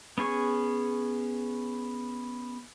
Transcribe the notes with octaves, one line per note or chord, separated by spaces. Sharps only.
B3 C#4 G#4 C#6